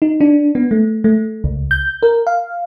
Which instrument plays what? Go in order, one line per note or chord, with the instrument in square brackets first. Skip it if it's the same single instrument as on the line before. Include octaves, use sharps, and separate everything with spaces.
[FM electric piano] D#4
D4
B3
A3
A3
C#2
G6
A#4
F5